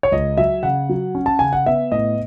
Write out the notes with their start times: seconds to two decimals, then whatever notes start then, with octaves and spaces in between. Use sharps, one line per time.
0.03 C#5
0.12 C#2 D#5
0.37 F#3 E5
0.63 C#3 F#5
0.89 F#3
1.15 C#4
1.26 A5
1.39 C#3 G#5
1.53 F#5
1.66 B3 E5
1.92 A2 D#5